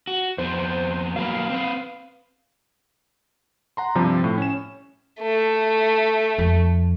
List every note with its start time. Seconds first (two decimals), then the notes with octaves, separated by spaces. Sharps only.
0.07 F#4
0.38 F2 B3 C5
1.16 F#3 A#3 B4 F5
1.50 C4 B4
3.77 F#5 A#5 C6
3.95 G2 C3 F3 G3
4.24 A2
4.38 C#4 E7
5.22 A3
6.38 F2